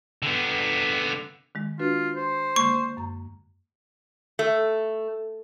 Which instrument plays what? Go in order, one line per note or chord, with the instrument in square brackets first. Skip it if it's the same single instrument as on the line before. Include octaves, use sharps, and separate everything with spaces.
[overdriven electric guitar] D3 B3
[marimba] D#3 G#3
[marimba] D4 F#4 B4 [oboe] F4
[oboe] C5
[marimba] D3 G#3 A#3 [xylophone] C#6
[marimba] F#2 A#5
[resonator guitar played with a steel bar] A3